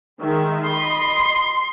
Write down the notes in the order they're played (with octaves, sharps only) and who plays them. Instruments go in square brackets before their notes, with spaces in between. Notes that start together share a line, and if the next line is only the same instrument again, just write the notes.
[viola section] D#3 G#3 E5
[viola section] D#5 B5 [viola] C6